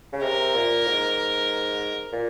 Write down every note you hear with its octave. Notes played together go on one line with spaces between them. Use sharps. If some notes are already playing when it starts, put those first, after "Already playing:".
C#3
C3 A#4
A#2
G#2
A#2